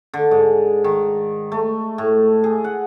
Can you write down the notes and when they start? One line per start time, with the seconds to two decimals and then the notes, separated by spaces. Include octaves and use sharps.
0.14 D3
0.31 G#2
0.84 D#3
1.52 A3
1.98 A2
2.44 G#4
2.64 F#5